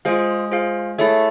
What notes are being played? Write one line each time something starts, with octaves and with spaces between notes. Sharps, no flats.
G#3 F4 G#4 C5 F5
F4 G#4 C5 F5
A3 E4 G#4 C#5 E5